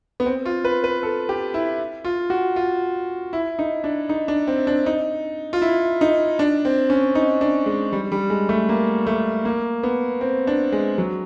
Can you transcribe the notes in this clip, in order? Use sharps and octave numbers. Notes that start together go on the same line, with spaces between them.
B3
C4
F4
B4
B4
A4
G4
E4
F4
F#4
F4
E4
D#4
D4
D#4
D4
C4
D4
D#4
F4
E4
D#4
D4
C4
C#4
D#4
D4
G#3
G3
G3
G#3
A3
A#3
A3
A#3
B3
C4
D4
G#3
F#3